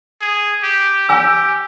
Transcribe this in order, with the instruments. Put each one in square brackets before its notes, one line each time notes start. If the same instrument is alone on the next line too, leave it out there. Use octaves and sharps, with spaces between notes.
[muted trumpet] G#4
G4
[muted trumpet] G4 [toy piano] G#5 E6